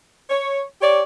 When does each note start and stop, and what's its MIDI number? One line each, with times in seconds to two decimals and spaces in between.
0.30 0.62 73
0.82 1.02 67
0.82 1.02 73
0.82 1.02 74